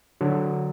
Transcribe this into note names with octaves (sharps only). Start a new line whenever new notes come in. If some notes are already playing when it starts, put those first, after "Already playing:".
D3 F#3